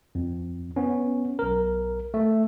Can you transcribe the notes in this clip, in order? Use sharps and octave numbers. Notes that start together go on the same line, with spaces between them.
F2
B3 C#4
B1 A#4
A3